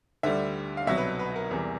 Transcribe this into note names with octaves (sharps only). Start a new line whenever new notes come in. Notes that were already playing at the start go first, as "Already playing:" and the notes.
D2 D3 G3 E5
F5
C2 B2 F#3 E5
B4
B4
A#4
E2 C3 E3 G3